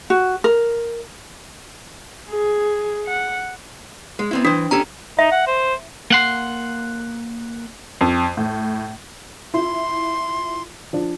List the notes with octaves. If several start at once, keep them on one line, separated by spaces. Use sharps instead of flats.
F#4
A#4
G#4
F#5
G#3
B3 C4 E4
E3 D4 C5
C#4 G4 A4 A#5
D#4 E5
F#5
C5
A#3 F#5 C6
F2
A2
E4 F4 C6
F3 D4